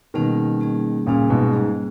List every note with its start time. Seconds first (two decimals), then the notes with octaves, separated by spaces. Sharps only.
0.14 B2 D#3 G3 A#3 C#4 G#4
0.60 G3 A#3 C#4 G#4
1.06 A#2 C#3 G3 A#3 C#4 G#4
1.30 G#2 B2
1.53 G#2 G3 A#3 C#4 G#4